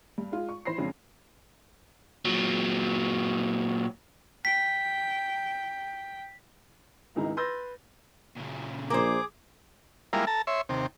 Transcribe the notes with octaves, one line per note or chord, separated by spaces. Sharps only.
G2
G#3 F4
C#6
E3 C5 B5 A#6 C7
F2 C#3 G#3 C4 D4
A#2 F#3
G5 B6
G#1 C#2 D#3 E4 A#5
B4 C6 E6 G6 A6 A#6
A#2 C#3
A#1 A#3 G#4 C5 D6
G3 G#3 A#3 E4 F4 A#4
A4 A5 A#5
C#5 E5 C6
D#2 C3